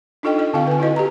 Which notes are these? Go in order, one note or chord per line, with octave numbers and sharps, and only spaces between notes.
D4 D#4 F4 A4 D#5 G5
A4 D#5
D3 C4 F4 A4 F5 G5
B4 G#5
E4 F#4 B4 D#5
G4 A#5